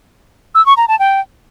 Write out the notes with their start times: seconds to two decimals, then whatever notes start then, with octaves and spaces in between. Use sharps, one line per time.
0.55 E6
0.66 C#6
0.77 A#5
0.88 A5
0.99 G5